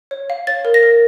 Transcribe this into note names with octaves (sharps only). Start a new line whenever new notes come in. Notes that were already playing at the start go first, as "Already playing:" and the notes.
C#5
F5
C#5 A6
A#4
A#6
A#4